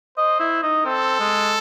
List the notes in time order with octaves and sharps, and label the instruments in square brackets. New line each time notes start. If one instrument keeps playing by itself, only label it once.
[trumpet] C5 [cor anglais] D#5
[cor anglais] E4
D#4
[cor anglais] C4 [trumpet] A4
[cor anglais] G#3